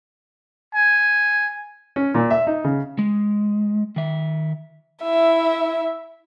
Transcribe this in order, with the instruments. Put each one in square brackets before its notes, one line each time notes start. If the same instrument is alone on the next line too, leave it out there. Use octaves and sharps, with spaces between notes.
[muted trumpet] G#5
[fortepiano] C#4
A#2
E5
D#4
C#3
[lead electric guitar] G#3
D#3 E5
[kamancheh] E4 E5